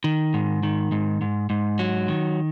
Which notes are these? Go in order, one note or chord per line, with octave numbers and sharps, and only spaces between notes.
D#3
G#2
D#3
G#2
G#2
G#2
F#3
D#3